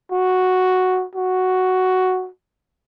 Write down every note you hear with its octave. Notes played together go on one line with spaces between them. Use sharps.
F#4
F#4